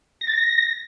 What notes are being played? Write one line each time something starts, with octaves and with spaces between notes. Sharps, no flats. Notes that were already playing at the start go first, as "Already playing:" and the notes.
A#6
A6
A#6